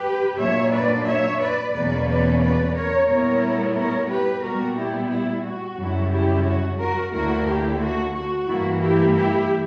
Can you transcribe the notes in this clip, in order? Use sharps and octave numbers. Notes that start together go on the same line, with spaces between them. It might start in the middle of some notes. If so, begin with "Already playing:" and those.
Already playing: G4 B4
A#2 F#3 A#3 D4 C#5 E5
B4 D5
C#5 E5
B4 D5
E2 B2 F#3 A#3 C#4 B4 D5
B4 D5
B4 D5
A#4 C#5
A#2 G3 B3 E4 A#4 C#5
A#4 C#5
G4 B4
A#2 G3 B3 F#4 A#4
E4 G4
E4
F#4
F#2 C#3 G3 C#4 E4
E4 G4
F#4
F#4 A#4
D2 D3 A#3 E4 F#4 A#4
E4 G4
F#4
F#4
G2 E3 A#3 E4
E4 G4
E4 G4